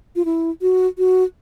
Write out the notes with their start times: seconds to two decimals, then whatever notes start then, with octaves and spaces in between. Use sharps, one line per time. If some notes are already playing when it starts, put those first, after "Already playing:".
0.16 F4
0.25 E4
0.62 F#4
0.98 F#4